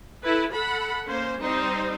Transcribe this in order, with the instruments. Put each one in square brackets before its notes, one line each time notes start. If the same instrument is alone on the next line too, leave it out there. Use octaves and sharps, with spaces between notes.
[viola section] E4 A4 B4
A4 F#5 B5
A#3 C#4 C5
G3 C4 D#4 C5